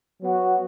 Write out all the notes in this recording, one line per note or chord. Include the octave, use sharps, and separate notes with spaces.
F#3 B3 F#4